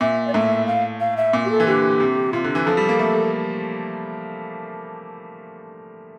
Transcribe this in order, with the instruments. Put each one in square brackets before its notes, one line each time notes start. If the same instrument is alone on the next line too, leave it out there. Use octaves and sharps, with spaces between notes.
[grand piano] A#2 [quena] E5
[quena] D5
[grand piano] A2 [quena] E5
[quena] F5
F5
E5
[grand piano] A#2
[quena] G4
A4
[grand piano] E3
[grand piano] D3 [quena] G4
[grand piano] C3
[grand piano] C3 [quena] F4
[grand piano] D3
E3
[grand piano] F3 [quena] A4
[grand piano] G3
A#3
A3